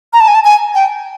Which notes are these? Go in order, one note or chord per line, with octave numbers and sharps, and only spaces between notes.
A#5
A5
G#5
A5
G#5
G5